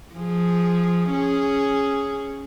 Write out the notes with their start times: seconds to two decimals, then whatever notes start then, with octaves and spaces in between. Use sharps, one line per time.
0.14 F3 G#4
1.11 C#4 G#4